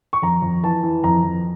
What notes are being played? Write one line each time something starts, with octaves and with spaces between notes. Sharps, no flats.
C#6
F2 A#5
F2
E3 A5
E3
F2 A#5
F2